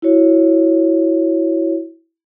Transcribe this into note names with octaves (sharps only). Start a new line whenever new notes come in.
E4 F#4 C#5